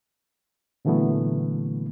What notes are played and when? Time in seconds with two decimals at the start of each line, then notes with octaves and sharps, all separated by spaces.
0.85 A#2 D3 E3 F#3 A3 B3